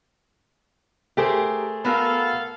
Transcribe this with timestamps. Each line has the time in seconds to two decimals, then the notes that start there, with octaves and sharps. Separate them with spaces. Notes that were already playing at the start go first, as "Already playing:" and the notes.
1.17 A3 G4 G#4 A#4 C5
1.85 B3 F#4 A4 A#4 F5